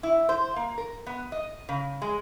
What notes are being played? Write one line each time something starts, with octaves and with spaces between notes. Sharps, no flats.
E4
C5
A#3
A#4
B3
D#5
C#3
G#3